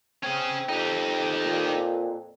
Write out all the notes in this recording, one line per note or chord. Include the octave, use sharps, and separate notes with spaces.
C4 C#4 G#4
F2 D#4 G4
A#2